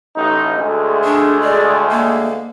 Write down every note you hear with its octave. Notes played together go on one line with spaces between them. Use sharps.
A1 D#4
D2 G#3
D4
D5
A#3